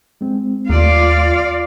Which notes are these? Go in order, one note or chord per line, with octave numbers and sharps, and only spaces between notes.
G#3 C4
D#2 A3 F4 D5 F5